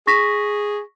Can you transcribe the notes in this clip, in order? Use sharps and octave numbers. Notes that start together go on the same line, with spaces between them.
G#4 C#6 A#6 B6